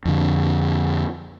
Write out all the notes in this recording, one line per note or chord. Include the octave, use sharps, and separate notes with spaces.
F2 D3